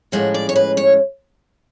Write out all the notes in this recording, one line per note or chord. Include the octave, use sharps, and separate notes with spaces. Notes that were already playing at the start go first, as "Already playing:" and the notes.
A2 F3 G#3 C#4 F#5
D5
C#5
B4
C#5